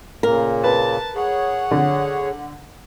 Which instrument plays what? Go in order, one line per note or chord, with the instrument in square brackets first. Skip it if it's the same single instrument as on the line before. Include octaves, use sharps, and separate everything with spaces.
[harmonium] A#2 C#3 A#3 [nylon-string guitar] A#4
[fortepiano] B4 [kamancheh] A5
[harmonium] G#4 C#5 [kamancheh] F#5
[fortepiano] D3